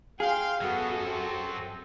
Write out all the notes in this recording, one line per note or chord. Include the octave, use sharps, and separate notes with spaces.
G#4 F5 G5 C6
F#2 F#3 B3 F#4 A4
C4